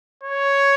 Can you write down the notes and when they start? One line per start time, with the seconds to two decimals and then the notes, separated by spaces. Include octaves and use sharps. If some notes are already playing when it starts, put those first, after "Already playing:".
0.23 C#5